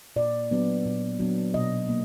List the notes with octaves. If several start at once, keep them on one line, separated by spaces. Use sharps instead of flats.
A#2 D5
F#3 B3 D4
A#2
F#3 B3 D4
B2 D#5
A#3